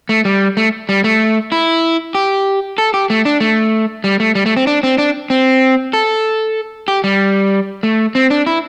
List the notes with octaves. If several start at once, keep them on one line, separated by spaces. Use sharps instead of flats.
A3
G3
A3
G3
A3
E4
G4
A4
G4
A3
D4
A3
G3
A3
G3
A3
C4
D4
C4
D4
C4
A4
G4
G3
A3
C4
D4
E4